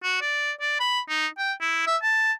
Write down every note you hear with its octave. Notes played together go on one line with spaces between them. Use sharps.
F#4
D5
D5
B5
D#4
G5
E4
E5
A5